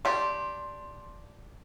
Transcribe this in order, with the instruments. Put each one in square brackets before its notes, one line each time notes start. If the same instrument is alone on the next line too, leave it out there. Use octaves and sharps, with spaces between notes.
[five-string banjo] D4 G4 [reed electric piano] C6